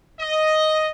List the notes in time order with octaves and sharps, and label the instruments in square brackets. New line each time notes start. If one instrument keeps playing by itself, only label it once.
[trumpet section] D#5